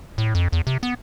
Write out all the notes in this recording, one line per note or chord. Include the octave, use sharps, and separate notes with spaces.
A2
F2
E2
C3
B3